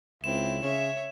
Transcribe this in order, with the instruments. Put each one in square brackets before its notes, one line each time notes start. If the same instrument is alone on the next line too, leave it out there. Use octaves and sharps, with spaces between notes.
[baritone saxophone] C#2 [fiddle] C4 E4 [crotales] E7
[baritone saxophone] C#3 [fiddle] C#5 E5